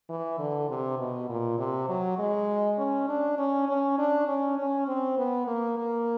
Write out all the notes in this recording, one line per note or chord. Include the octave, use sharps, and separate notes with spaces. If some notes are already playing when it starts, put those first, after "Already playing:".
E3
D3
C3
B2
A#2
C3
F#3
G#3
C#4
D4
C#4
C#4
D4
C#4
C#4
C4
B3
A#3
A#3